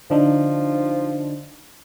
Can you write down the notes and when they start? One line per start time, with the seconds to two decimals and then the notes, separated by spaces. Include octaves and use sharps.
0.10 D3 F3 D4 D#4